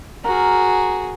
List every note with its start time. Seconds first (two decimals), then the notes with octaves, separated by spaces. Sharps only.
0.24 F#4 G#4 A#4